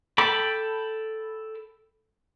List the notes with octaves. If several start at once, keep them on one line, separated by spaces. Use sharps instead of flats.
A4 G5 B5 D6